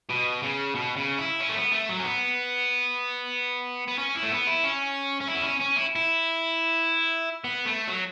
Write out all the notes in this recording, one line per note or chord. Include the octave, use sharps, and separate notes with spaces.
B2
C#3
B2
C#3
E4
C#4
A3
B3
A3
F#3
C#4
B3
B3
C#4
E4
A3
B3
E4
C#4
C#4
E4
B3
C#4
C#4
E4
E4
B3
A3
F#3